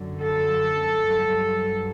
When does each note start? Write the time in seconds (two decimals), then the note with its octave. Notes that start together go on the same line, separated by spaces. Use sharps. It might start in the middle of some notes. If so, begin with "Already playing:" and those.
Already playing: F#2 D3 F#3
0.22 A4
1.01 G2 F#3